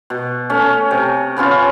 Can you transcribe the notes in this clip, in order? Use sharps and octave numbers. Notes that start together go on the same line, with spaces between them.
B2
A3 C#4
C3
C#3 B3 C#4 F4